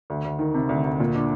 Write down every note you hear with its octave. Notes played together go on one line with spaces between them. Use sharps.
D2
D2
D#3
C3
D2
D2
A#2
D4